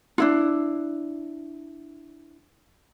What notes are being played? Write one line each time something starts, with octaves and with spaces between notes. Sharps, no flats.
D4 E4 F4